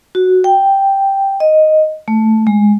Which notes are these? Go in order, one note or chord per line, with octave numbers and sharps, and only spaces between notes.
F#4
G5
D#5
A3
G#3